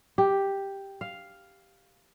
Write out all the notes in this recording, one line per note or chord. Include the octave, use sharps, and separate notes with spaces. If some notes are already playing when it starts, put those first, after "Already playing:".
G4
F5